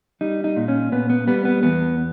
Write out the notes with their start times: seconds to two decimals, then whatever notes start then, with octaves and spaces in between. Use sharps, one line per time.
0.21 G3 D#4
0.44 D#4
0.56 A#2
0.68 C#4
0.92 A#2 B3
1.10 B3
1.27 G3 B3
1.45 B3
1.63 E2 B3